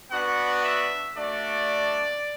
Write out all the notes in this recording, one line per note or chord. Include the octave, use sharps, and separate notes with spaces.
B3 D4 F#4 F#5
E5
A3 D4 F#4 D5